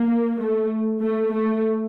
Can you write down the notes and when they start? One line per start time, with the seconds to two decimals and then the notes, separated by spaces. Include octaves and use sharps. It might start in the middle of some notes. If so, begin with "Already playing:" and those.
Already playing: A#3
0.39 A3
1.01 A3
1.32 A3